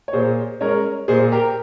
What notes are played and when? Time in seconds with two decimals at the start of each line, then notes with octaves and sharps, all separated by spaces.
0.08 C#5
0.13 A#2 G#4 C5
0.61 G#3 C#4 A#4 C#5
1.08 A#2 G#4 C5
1.32 G4 A#4